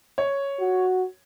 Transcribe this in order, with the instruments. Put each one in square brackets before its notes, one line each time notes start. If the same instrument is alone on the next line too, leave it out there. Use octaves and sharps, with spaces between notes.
[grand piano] C#5
[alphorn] F#4